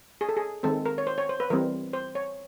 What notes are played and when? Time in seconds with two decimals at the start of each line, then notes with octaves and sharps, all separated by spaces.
0.21 G#4
0.29 A4
0.37 G#4
0.63 D#3 G#3 C4 A4
0.86 A#4
0.98 C#5
1.07 C5
1.18 C#5
1.29 C5
1.40 B4
1.50 E3 G3 C4 A#4
1.93 C5
2.15 C#5